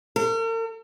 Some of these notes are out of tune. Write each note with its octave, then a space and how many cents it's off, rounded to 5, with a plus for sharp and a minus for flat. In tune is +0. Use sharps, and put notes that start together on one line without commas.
A#4 -45